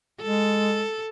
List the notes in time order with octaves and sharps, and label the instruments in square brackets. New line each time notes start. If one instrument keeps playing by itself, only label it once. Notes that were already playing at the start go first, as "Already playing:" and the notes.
[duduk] G#3 [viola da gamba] A4